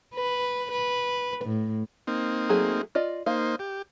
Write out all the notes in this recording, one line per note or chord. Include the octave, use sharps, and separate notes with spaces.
B4
B4
A2
A#3 C4 D#4
F#3 A3 G#4
F4 D5 D#5
A#3 D#4 C5 F5
G4